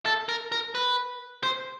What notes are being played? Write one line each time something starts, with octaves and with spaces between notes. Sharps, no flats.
A4
A#4
A#4
B4
C5